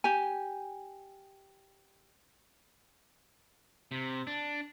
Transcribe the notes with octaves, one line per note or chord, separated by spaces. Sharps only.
G4 G#5
C3
D4